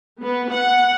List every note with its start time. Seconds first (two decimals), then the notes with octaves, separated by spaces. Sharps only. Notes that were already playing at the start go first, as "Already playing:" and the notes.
0.20 B3
0.51 F#5